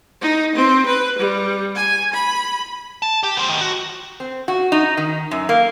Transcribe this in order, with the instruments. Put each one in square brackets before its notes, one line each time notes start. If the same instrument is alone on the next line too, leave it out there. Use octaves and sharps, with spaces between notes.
[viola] D#4
C4
B4
G3
G#5
B5
[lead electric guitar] A5
G4
B3 C5
A2 D#3
F#4
[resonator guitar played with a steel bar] C4
F#4
D#4
D#3
F#2
A#3